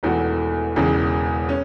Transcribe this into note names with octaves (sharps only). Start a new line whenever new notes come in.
E1 E2 E3 A3 F#4
E1 E2 C#3 E3
C#4